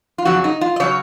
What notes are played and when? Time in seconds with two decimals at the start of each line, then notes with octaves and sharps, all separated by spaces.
0.18 F4
0.25 F2 C#3 F#3 F#4
0.44 D#4
0.61 F4
0.76 D#5
0.80 C#3 F#3 C#4 C#5